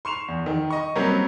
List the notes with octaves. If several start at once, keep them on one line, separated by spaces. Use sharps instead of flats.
C6 C#6 E7 F7
E2
D#3
D#5 C#6
F#3 G3 A#3 C4 C#4 A#4